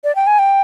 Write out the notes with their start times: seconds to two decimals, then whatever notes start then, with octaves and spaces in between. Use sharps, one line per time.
0.04 D5
0.16 G5
0.27 G#5
0.39 G5